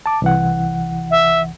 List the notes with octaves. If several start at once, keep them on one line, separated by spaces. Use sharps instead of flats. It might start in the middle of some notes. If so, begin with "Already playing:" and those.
A5 D6
C2 E3 F#5
E5